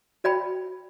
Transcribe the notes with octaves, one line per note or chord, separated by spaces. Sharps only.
F#4 D5 G5 B5